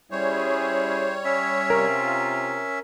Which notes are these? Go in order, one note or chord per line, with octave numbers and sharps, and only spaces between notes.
G3 C#4 E4 G#4 C5 C#5
C#4 E5
C3 F4 A#4